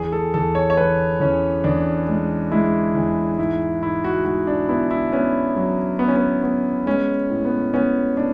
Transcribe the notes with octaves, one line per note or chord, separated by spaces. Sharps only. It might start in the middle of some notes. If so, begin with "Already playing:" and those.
Already playing: E2 G#4
A4
E2 A4
C#5
C#5
E3 B4
E2 C#4
E2 D4
G#3
G#3 E4
E2
G#2 E4
G#2 E4
F#4
G#2 F#4
D4
B3 E4
E4
B3 C#4
F#3
B3
C#4
B3
B3
G#3 C#4
A2
B3
B3 C#4
B3 D4